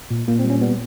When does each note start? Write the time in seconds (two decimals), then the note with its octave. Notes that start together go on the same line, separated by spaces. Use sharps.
0.11 A#2
0.28 A#2 A#3
0.39 C4
0.44 G3
0.50 C#4
0.61 G3 B3